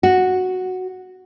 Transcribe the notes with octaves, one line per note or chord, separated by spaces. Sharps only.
F#4